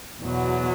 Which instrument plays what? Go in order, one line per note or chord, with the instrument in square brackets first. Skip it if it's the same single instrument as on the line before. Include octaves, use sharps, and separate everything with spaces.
[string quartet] E2 B2 F#3 B3